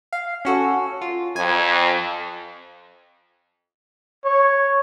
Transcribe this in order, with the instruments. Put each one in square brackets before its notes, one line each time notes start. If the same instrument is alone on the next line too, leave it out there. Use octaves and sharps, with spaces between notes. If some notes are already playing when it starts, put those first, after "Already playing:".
[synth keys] F5
C#4 F#4 A4
F4
[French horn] F2 [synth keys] G#5
[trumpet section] C#5